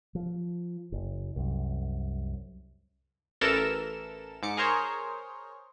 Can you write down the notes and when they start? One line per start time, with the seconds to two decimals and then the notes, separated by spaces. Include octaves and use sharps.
0.15 F3
0.92 F#1
1.36 C2 F#2
3.41 A1 E3 A4 A#4 E7
4.43 G#2 D6 C#7
4.57 G#4 A#4 C5 C#5